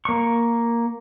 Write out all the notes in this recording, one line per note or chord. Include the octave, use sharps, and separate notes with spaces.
A#3 C#6